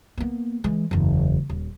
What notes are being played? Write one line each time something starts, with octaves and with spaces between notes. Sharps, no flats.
A#3 B3
E3 G#3
F#1 E2
D#1